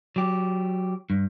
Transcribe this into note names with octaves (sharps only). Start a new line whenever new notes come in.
F#3 G4
G2